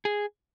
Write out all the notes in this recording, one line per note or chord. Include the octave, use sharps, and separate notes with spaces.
G#4